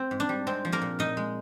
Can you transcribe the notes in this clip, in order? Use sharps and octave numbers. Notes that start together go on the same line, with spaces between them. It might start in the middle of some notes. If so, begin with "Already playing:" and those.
Already playing: C4
G#2
D4
G3
G#3 C4
F3
A#3 A#4
A#2
A#2 D#4 D#5
G#3